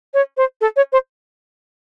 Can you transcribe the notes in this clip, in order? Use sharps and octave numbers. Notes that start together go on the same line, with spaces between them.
C#5
C5
A4
C#5
C5